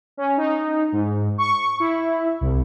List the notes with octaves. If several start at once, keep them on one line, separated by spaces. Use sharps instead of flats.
C#4
D#4
G#2
C#6
E4
C2